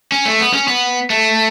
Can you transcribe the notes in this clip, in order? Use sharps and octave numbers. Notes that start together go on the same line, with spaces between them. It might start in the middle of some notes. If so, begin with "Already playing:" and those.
C#4
A3
B3
C#4
B3
A3